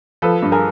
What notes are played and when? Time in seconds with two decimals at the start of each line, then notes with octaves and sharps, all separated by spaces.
0.22 F3 A4 B4
0.43 G2
0.52 G#4 A#4